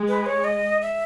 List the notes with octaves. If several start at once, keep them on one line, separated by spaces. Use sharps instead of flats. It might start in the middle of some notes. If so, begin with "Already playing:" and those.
Already playing: G#3
B4
C#5
D#5
E5